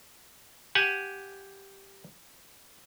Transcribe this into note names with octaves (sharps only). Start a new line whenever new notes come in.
G4 F#5 G#5